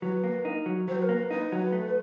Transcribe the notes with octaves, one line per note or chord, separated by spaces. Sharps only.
F#3 B4
A#3
D#4 A#4
F#3
F#3 C5
B4
A#4
A#3 B4
D#4 B4
F#3
A3